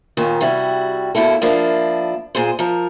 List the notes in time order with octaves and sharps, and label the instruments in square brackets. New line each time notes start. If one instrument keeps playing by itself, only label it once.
[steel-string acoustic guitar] D#2 A#2 D#3
C3 G3 E4 F#4
D#2 B2 A#3 E4 A4
F3 A#3 D4 E4
A#2 G#4 C5
F3 A#4